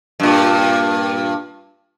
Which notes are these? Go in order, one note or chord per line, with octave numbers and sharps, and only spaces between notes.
G2 A#2